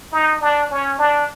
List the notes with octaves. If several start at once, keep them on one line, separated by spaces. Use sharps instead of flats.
D#4
D4
C#4
D4